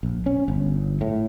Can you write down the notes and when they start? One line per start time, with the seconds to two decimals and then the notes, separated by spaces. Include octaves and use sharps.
0.03 A#1
0.26 C#4
0.48 G1
1.01 A2